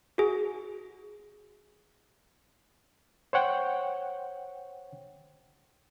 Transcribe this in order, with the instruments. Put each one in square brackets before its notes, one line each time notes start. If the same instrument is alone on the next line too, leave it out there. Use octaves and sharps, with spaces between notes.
[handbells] F#4 G#4
[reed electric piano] C5 C#5 F#5 G5